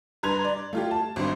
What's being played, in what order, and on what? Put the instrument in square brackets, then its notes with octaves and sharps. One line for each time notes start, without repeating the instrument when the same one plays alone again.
[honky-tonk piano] G2 B4 A#5 C6 G#6 F7
D5
A3 F4 G4
A5
G#1 G2 C5